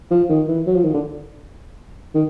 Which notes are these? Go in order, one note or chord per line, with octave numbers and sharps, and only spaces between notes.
F3
D#3
E3
F#3
F3
D#3
D3
D#3